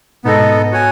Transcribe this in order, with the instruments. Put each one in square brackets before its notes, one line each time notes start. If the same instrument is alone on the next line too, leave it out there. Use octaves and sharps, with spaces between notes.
[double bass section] G#2 B2 [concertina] B3 D#4 A4 D#5
[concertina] F#4 C#5 G#5